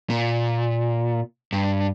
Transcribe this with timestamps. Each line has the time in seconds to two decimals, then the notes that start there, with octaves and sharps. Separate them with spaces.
0.10 A#2
1.52 G2